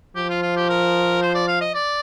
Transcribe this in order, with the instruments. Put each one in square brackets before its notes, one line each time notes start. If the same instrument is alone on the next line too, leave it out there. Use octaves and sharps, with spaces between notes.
[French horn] F3 [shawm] G4
[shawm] F4
F4
G4
A#4
C5
D5
F5
D#5
D5